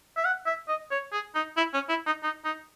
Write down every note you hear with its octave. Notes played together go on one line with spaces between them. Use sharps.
E5
F#5
E5
D#5
C#5
G#4
D#4
E4
C#4
E4
D#4
D#4
D#4